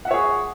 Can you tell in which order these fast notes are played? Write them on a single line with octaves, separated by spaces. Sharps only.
F#5 E5 C#5 G#4